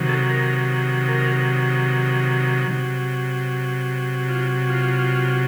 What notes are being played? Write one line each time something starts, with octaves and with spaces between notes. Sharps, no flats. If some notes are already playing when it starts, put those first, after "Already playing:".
Already playing: C3 D#3 F#3
A4
A#4
A#4
C3 F#3
F4
F4